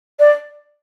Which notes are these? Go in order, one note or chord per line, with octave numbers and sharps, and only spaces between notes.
D5